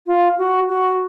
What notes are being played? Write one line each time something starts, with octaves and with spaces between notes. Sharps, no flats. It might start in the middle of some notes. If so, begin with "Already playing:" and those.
F4
F#4
F#4